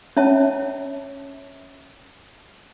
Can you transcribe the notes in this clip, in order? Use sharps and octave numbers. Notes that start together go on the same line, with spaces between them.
C#4 C#5 E5 A5